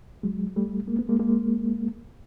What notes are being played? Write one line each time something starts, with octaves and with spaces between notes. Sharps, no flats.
F#3 G#3
G3 A3
G#3 A#3
A3 B3
G#3 A#3
G#3 A#3